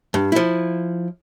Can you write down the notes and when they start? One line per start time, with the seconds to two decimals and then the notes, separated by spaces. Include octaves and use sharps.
0.14 G2
0.32 F3 E4